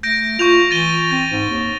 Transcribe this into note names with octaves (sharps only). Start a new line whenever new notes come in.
A3 G6 A#6 D7
F4 C#6 G6 F7
E3 A6 D#7 G7
C4 A6
G#2
D#2